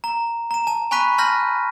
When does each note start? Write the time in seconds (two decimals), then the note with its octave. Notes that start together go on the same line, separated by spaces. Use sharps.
0.04 A#5
0.51 A#5 E7
0.67 A5 E7
0.91 G#5 B5 C#6 F#6 B6 D#7
1.18 A5 C6 F6 G6 A#6